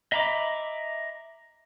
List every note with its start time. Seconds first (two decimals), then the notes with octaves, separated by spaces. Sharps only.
0.12 D#5 E5 A#5 B5 D6